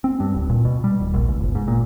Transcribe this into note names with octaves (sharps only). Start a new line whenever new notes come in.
C4
G2
D1
A#2
B2
G3
D#1
A#1
C#2
G1
G#2
A#2